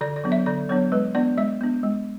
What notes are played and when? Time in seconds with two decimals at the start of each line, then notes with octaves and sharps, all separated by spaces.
0.01 D3 D5
0.16 D5
0.24 F#3 B3 D4
0.32 E5
0.46 D3 D5
0.69 F#3 B3 D4 C#5
0.92 G#3 B4
1.15 B3 D4 D5
1.37 G#3 E5
1.61 B3 D4
1.83 G#3